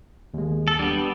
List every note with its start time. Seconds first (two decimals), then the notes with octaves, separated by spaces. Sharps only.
0.34 D#2 G#3
0.68 A4
0.79 G3 B3 D4